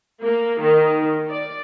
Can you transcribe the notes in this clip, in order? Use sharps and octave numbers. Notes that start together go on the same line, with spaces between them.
A#3
D#3
D5